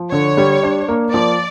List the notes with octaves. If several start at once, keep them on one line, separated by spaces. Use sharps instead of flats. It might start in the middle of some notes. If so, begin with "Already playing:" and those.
Already playing: F3
D3 C#5
G3
D4
A#3
F3 D5